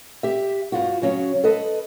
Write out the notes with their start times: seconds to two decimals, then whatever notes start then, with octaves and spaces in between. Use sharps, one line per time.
0.23 G4 E5
0.72 G2 F4 F#4
1.02 C#3 F#3 C#4
1.44 A4 B4 D#5